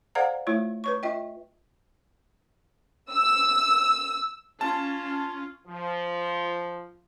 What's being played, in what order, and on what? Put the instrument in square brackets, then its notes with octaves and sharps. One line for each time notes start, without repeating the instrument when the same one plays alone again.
[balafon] A4 C5 D5 F5 F#5 A#5
A3 E4 F4 C#5
B4 C#5 C#6
F4 D#5 E5 G5
[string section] E6
[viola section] C#4 F4 [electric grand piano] A5
[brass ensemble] F3